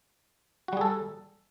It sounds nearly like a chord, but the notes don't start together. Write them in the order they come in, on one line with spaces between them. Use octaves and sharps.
F#4 G3 G#4 A4